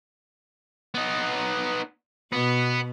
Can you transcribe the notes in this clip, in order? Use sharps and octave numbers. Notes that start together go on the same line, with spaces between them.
B3 D#4
B2 B3